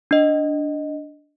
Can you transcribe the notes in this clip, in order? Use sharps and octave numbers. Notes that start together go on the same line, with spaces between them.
D4 D#5